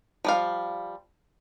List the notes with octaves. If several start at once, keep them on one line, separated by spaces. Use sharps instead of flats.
F3 G3 F5